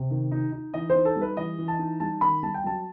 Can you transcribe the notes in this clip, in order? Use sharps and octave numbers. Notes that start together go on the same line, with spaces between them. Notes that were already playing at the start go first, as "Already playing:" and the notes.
Already playing: C3
D#3
D#4
D#4
E3 D#5
C5
D#4
A4
G3
B4
E3 D#5
E3
A5
D#4
G3 A5
D#3 B5
G3 A5
G5
F#3 A5